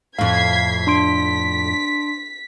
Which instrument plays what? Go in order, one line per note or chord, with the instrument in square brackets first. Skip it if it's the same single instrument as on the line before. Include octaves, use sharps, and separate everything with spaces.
[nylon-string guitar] F2 A2 [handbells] F5 [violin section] G#6 B6 C7
[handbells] D4 C6 D7 [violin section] B6